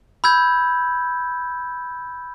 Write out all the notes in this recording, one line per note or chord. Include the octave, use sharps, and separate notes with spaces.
B5 E6 G6 G#6